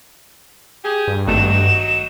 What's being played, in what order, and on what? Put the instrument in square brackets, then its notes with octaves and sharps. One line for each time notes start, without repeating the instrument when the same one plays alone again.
[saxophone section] G4 G#4
[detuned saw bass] G2
[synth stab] G#1 A3 [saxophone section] F#3 D#4 F#4 [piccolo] E7